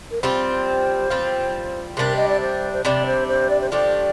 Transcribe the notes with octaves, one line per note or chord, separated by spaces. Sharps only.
A#4
G3 C4 F4 C5
G3 C4 F4
C3 G3 D4 A#4
D#5
D5
C5
C5
C3 G3 D4 D5
C5
C5
D5
C5
F3 A3 D4 G4 D5